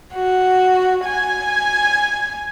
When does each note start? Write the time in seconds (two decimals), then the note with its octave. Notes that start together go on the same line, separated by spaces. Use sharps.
0.14 F#4
1.05 G#5